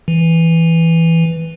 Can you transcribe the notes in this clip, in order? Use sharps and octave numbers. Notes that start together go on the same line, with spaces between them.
E3